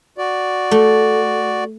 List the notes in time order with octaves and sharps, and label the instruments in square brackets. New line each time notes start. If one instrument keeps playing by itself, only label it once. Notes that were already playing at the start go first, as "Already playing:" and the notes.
[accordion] F#4 D5
[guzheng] A3